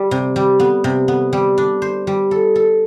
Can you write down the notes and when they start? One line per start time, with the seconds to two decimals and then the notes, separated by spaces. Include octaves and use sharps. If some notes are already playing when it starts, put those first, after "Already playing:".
Already playing: G3
0.11 C3
0.36 G3
0.60 B3
0.84 C3
1.08 B3
1.33 G3
1.58 D4
1.82 C5
2.07 G3
2.31 A4
2.56 A4